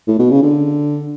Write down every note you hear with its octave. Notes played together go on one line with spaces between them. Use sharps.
A2
B2
C#3
D3